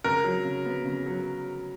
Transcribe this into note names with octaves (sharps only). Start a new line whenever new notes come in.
C#3 A#4
F#3
C#3
B3
C#3
F#3